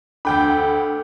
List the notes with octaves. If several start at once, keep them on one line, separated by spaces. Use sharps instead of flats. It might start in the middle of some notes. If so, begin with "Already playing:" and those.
D2 D4 A4 G5 B5